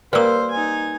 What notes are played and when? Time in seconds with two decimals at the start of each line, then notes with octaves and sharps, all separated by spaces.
0.13 G3 A#3 B4 C5 E6
0.51 D#4 G#5